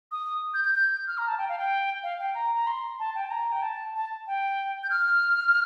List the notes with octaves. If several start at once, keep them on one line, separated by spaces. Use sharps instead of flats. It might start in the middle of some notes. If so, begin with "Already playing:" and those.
D#6
G6
G6
G6
F6
A#5
A5
G5
F5
G5
F5
G5
A#5
A#5
C6
A5
G5
A5
A#5
G5
A5
A5
G5
G6
F6